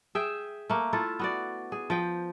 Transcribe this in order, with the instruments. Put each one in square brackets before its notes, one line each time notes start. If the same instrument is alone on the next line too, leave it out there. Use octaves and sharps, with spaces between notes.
[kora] G#4 E5 G5
A3 A#3
E4 F4 A4
B3 F#4 D5
G#4
F3 G5